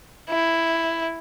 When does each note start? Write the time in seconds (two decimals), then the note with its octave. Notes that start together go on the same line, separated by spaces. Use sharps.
0.29 E4